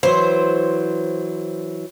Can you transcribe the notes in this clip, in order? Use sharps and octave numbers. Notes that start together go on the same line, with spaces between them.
E3 F#3 C5